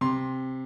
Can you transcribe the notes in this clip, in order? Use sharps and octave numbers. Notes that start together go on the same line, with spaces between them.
C3 C6